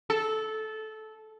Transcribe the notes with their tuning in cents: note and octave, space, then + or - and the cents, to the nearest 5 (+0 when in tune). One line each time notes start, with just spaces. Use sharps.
A4 -15